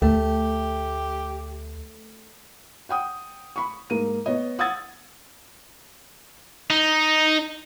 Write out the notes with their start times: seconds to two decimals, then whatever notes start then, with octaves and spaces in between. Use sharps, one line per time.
0.02 D2 A3 G4
2.89 F#5 G5 D#6
3.56 B5 C#6
3.90 G#2 A#3 D#7
4.26 B3 C#5 D#5
4.59 F#5 D#6 E6 G#6 A6
6.70 D#4